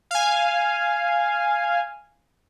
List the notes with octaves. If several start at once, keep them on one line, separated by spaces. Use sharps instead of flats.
F5 G#5